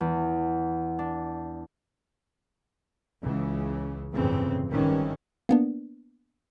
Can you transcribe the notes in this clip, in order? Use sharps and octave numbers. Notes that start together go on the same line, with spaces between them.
E2
D4
C#2 C#3 E3
G1 F2 A2 C#3 E3 C4
G#1 D#3 E3 G3 C#4
A#3 B3 D4